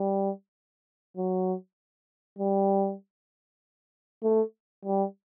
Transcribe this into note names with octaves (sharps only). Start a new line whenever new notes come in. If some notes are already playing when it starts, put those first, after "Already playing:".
Already playing: G3
F#3
G3
A3
G3